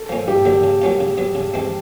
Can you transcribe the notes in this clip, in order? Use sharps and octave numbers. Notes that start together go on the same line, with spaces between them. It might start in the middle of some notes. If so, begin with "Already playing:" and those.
Already playing: A4
F3 A#3 C#4
G2 G4
D3 F#3 A#3
C#3
F#3 A#3 C#4 F4
C#3
F#3 B3
C#3
E3 G#3 C4